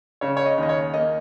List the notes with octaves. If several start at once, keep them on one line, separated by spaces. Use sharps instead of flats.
C#3 C#5
C#5
D#5
D#2
D#5
C#5
A#3 D#5